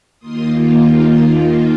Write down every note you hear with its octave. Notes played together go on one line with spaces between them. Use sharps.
D#2 D#3 A#3 F4 C6 D#6
C6 D#6